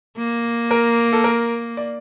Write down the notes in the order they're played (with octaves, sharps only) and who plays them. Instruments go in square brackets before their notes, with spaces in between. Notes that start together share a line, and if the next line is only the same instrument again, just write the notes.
[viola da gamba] A#3
[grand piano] A#4
A4
A#4
D5